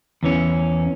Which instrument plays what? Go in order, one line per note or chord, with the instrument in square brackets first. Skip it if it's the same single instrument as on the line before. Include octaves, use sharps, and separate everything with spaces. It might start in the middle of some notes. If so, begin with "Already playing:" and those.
[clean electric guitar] E2 E3 C#4